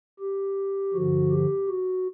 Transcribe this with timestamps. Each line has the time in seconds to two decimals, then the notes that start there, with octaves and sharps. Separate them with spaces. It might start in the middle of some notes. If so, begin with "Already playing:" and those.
0.19 G4
0.94 G2 D3 F3 F#4
1.31 G4
1.68 F#4